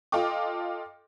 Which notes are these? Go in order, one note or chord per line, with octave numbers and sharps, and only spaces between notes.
F4 A4 D#5 G5 D6